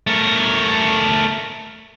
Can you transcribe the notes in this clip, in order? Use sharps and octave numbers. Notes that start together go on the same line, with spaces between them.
A3 A#4